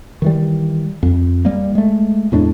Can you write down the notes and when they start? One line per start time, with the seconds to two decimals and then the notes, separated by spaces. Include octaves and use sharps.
0.22 D#3 E3 G3
1.03 F2
1.45 G3 A#3
1.75 G#3 A3
2.32 E2 A2 G#3 D4